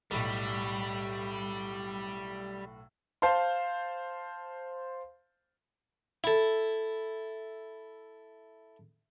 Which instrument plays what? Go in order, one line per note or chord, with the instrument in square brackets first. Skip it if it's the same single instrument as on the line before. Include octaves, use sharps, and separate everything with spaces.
[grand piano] B1 A2 [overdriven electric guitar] G3
[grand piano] C5 F5 A5 C6
[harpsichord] E4 A4